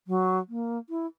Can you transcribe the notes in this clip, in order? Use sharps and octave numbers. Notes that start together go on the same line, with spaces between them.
F#3
A#3
E4